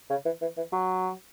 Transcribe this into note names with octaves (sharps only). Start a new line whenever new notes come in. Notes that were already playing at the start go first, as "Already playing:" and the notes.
C#3
E3
E3
E3
F#3